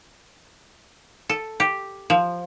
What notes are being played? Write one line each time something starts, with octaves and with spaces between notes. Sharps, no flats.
A4
G4
F3